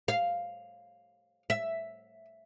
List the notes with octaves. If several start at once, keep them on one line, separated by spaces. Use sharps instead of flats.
F5
E5